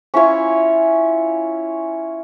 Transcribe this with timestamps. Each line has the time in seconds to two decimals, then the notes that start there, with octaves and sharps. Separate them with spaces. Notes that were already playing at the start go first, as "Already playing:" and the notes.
0.14 C#4 E4 F4 C#5